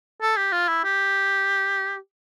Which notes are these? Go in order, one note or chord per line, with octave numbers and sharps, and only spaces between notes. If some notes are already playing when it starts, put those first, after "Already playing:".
A4
G4
F4
E4
G4